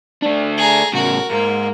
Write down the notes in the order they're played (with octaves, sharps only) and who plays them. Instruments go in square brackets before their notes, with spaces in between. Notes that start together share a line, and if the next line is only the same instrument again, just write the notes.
[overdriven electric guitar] A3 D4
[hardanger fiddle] G#4 A#5
[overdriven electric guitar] A2 C#3 [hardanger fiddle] F#4 A#4
[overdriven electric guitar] G#2 [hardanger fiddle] A#3